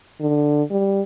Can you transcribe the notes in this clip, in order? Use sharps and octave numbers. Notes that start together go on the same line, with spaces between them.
D3
G3